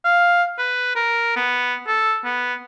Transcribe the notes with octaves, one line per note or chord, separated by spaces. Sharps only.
F5
B4
A#4
B3
A4
B3